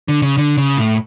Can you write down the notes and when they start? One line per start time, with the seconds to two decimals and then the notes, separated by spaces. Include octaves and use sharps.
0.08 D3
0.22 C#3
0.38 D3
0.58 C#3
0.77 A2